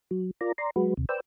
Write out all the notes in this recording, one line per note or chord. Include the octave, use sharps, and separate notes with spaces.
F#3
F4 A#4 D5 A#5
D5 A#5 C6
F#3 G#3 F#4 B4
D#2 C3
B4 C5 D5 G5 E6